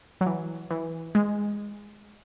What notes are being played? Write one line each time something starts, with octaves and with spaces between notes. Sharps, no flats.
F#3
E3
E3
G#3